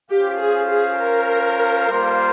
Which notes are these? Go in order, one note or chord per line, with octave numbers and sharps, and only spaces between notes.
C#4 F4 G4 C5 F5
G#4
G#4
A#4
G3 A#3 F4 C5 F5